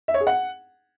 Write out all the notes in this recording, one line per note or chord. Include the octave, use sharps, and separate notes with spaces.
E5
C#5
G#4
F#5